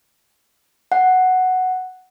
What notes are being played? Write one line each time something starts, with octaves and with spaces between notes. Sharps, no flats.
F#5